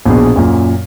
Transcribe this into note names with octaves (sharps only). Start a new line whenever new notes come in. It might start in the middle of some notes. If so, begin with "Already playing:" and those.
A#1 B2 G#4
F#2 A#2